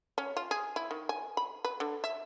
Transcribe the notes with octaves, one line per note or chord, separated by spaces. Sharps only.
C#4
F4
G#4
E4
D#3
G#5
B5
B4
D3
E5